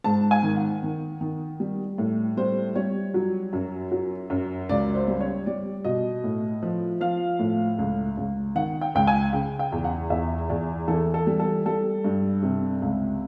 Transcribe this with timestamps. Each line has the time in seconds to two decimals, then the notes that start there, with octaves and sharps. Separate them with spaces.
0.04 G#2 A5
0.31 G#5
0.43 D#3
0.56 F#5
0.83 D#3
1.21 D#3
1.60 G3
1.98 A2
2.37 G3 C5
2.76 G3 C#5
3.14 F#3
3.53 F#2
3.91 F#3
4.30 F#2
4.69 C#2 D5
4.95 C5
5.08 G3
5.21 C#5
5.46 G3 D5
5.84 B2 D#5
6.24 A2
6.63 F3
7.01 F3 F5
7.39 A2
7.79 C#2
8.17 C#2
8.55 D#3 F#5
8.81 G5
8.95 C#2 G5
9.07 G#5
9.33 C#3 G5
9.59 G5
9.72 E2
9.84 F#5
10.10 E2 E5
10.49 E2 D5
10.88 E3 A4
11.14 A4
11.27 G3
11.40 A4
11.65 G3 A4
12.04 G2
12.43 C3
12.82 C#2